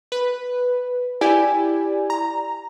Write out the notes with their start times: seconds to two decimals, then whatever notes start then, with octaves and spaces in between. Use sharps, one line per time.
0.12 B4
1.21 E4 G4 D5 G#5
2.10 A#5